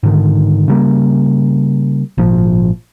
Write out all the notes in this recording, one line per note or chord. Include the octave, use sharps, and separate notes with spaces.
G#2 D3 D#3
C#3 G3 A#3
G#1 A#2 F3